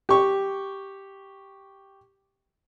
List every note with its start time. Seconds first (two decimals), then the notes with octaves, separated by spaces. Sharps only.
0.09 G4 C#6